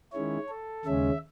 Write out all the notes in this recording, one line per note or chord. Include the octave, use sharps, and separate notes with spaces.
D#3 G#3 C#4 E4 C#5
A4
D#2 C#3 G#3 C#4 E5